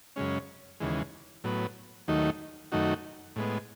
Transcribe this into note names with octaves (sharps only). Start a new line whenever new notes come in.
F#2 C#3 G#3 C#4
D#2 C#3 E3 G#3
A2 F#3 B3
D#2 D#3 F#3 A3 D#4
F#2 D#3 A3 D#4 F#4
A2 G#3 B3